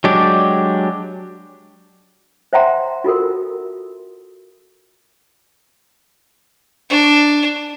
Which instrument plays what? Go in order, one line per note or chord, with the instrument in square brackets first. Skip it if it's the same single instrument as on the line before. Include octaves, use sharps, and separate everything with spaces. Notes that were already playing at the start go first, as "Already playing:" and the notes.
[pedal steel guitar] F#3 G#3 D4 G4
[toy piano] C5 E5 F#5 G5 A#5 C6
F4 F#4 A4 A#4
[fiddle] D4